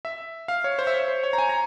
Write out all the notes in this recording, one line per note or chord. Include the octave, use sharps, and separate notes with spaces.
E5
F5
C#5
C5
E5
C#5
C5
C#5
A#5
G#5
A#5